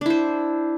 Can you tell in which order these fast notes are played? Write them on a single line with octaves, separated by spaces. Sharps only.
D4 E4 C5